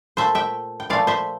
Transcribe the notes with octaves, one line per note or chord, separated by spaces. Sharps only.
A#2 A3 C5 E5
E5 G5
G5
A#2 F3 A3 D5 F5
C5 E5